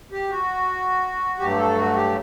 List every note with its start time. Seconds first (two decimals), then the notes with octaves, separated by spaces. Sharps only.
0.12 G4
0.30 F#4
1.39 G2 F#3 A3 G4
1.58 A4
1.76 F#4
1.95 G4